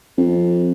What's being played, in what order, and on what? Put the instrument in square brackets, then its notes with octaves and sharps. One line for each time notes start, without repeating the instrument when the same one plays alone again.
[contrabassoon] F2